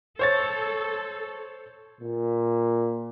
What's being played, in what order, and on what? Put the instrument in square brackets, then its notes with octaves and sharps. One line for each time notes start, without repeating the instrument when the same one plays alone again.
[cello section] A4 [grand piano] C5 C#5 A6
[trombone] A#2